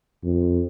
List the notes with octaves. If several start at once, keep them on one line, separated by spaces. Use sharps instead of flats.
F2